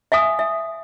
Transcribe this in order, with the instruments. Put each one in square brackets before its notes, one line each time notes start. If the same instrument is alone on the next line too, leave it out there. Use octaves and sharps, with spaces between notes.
[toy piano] E5 F5 G#5 D#6
E5